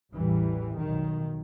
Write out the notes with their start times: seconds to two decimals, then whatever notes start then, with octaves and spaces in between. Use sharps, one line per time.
0.12 A1 E2 E3 G3
0.79 B1 D#3